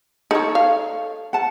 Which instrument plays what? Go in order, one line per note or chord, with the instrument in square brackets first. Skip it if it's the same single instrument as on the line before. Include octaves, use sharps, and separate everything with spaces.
[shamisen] D#4 [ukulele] A4 C#5
[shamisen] F5
[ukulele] F#5 A5